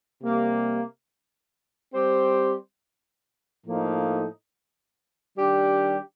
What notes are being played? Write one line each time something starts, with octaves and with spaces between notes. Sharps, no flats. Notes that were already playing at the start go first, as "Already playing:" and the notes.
C3 G3 A#3
G3 C4 G4 C5
A2 F3 A#3 D#4 A4
D#3 G3 D4 G4